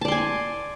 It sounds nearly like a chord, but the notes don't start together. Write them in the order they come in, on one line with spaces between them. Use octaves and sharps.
A5 D5 C6 G#5